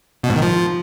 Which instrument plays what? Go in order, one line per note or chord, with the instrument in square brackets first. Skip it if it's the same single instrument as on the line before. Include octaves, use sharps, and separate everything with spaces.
[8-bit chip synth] B2
G#2
D#3
F3